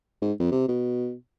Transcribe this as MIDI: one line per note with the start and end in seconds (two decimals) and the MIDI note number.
0.22 0.33 44
0.39 0.49 41
0.52 0.67 48
0.68 1.13 47